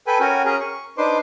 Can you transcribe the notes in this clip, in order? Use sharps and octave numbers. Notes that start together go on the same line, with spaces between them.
A4 B4 G5 G#5 B5
C#4 F#4 A#4 G5 G#5
C#4 G#4 A#4
C#6
D4 D#4 B4 C5 C6 D6